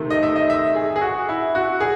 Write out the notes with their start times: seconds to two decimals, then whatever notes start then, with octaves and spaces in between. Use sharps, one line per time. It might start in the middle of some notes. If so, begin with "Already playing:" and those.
Already playing: C3 D#3 A3
0.10 D#5
0.23 E5
0.36 D#5
0.50 E5
0.75 G#4
0.96 G#4
1.01 F#4
1.29 E4
1.55 F#4
1.80 G#4